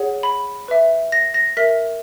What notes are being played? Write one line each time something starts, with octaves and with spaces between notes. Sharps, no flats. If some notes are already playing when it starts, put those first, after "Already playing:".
Already playing: G#4 C#5 F#5
B5
B4 E5
A#6
A#6
A#4 E5 B6